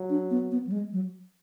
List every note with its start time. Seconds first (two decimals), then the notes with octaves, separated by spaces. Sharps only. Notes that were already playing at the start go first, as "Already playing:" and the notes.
Already playing: F#3
0.10 D4
0.31 B3
0.51 B3
0.67 F#3
0.72 G#3
0.93 F#3